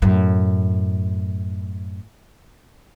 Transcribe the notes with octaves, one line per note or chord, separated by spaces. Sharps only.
F#2 A2